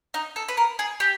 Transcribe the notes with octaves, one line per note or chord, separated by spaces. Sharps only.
D#4
A4
B4
A#4
G#4
G4